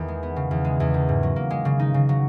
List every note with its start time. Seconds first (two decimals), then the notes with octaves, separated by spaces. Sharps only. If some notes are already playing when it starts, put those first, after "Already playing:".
Already playing: E2 D#3
0.08 G#3
0.23 B3
0.36 C#3
0.51 E2
0.65 G#3
0.80 E2
0.94 D#3
1.09 G#2
1.23 F#3
1.36 A#3
1.51 G#3
1.65 C#3
1.79 D#4
1.94 C#3
2.09 F#3